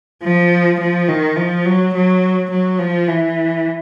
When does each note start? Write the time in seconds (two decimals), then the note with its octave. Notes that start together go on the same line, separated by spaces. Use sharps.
0.23 F3
0.80 F3
1.08 D#3
1.36 F3
1.65 F#3
1.94 F#3
2.51 F#3
2.79 F3
3.07 E3